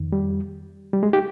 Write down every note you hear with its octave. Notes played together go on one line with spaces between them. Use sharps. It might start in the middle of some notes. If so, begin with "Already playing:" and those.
Already playing: F2 D#3
G3
G3
G#3
D#4 G4